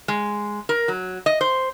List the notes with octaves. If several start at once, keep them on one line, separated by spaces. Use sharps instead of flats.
G#3
A#4
F#3
D#5
C5